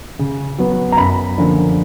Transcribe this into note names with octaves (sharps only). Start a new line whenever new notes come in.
C#3
F#3 B3
A#5
F#2 B5
D3 F3 A#3 C#4